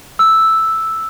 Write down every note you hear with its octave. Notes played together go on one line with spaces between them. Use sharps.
E6